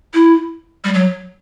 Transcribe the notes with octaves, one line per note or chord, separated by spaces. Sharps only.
E4
G3
F#3